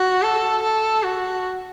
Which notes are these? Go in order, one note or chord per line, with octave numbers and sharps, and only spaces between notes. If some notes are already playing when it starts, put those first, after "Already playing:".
Already playing: F#4
A4
A4
F#4